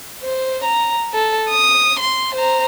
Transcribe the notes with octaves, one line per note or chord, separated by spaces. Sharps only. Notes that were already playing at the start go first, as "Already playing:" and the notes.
C5
A#5
A4
D#6
C6
C5 A#5